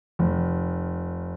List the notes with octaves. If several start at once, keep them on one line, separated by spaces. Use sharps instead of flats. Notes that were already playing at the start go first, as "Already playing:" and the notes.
F1